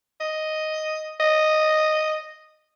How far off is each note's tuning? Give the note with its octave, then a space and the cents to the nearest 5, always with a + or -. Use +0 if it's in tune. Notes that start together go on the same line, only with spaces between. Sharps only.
D#5 +0
D#5 -5